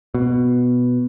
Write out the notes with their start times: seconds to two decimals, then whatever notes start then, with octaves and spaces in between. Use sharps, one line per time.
0.14 B2